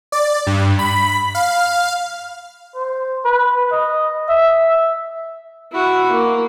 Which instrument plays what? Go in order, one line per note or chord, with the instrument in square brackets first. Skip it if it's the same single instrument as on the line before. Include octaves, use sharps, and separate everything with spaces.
[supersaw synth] D5
G2
B5
F5
[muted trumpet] C5
B4
D#5
E5
[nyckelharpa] E4 F#4
A#3